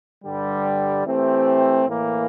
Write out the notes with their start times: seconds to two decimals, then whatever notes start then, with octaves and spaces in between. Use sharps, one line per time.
0.24 G2 D3 G3
1.05 E3 A3 C4 G4 C5
1.86 A2 E3 A#3